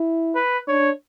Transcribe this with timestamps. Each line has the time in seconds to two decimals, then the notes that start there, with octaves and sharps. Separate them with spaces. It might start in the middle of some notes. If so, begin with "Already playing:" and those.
Already playing: E4
0.35 B4
0.68 D4 C#5